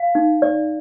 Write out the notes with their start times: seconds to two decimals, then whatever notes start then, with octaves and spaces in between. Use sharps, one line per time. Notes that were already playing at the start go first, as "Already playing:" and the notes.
Already playing: F5
0.15 D#4
0.42 D5